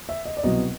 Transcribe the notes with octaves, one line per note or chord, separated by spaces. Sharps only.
E5
D#5
D5
C2 B2 F#3 B3 D#5